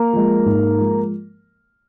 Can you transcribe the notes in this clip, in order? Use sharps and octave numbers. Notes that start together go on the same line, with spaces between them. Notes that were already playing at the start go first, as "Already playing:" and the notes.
Already playing: A#3 A#4
F3 G#3
G#2
F3 G#3